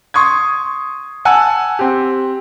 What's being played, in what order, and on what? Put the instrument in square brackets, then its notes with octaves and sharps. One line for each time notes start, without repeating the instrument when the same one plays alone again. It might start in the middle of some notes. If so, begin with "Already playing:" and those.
[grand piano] C6 C#6 D#6 G#6
F#5 G#5 A5 E6
C4 G4